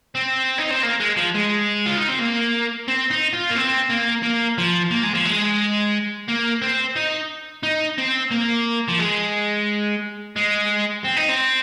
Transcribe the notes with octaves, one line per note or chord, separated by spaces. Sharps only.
C4
D#4
C4
A#3
G#3
F3
G#3
F4
D#4
C4
A#3
C4
D#4
F4
A#3
C4
A#3
A#3
F3
A#3
G#3
F3
G#3
A#3
C4
D#4
D#4
C4
A#3
F3
G#3
G#3
C4
D#4
C4